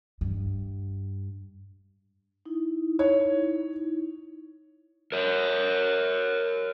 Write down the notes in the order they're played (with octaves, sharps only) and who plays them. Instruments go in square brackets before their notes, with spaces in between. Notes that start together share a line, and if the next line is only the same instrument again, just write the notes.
[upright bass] G2
[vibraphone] D#4 E4
[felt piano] C#5
[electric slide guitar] A#4 C#5